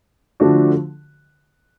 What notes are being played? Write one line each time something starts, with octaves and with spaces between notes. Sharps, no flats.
D3 F3 A3 D4 F#4